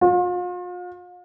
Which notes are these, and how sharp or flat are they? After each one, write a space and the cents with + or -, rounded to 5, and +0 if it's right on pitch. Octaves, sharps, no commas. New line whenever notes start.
F4 +40